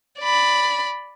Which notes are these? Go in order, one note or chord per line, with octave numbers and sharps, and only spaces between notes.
D5 B5